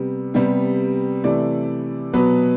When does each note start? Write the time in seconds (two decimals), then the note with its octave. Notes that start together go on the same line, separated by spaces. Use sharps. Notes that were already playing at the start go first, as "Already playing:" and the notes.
Already playing: C3 G3 B3
0.34 C3 G3 B3
1.24 C3 E3 A3 D5
2.13 B2 F#3 B3 B4